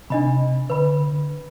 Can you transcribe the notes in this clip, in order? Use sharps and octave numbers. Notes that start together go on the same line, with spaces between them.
C3 D4 D#5 B5
D3 B4 B5